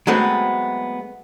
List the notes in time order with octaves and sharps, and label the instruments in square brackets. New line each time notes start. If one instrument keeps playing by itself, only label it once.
[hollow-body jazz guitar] F#3 G#3 A3 B3 C4 B4